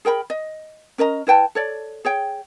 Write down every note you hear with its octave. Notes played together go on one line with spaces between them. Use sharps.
G#4 A#4 G5 B5
D#5
C#4 A#4 D#5 A#5
E4 B4 G5 A5
A4 C#5 D5
G#4 C#5 G5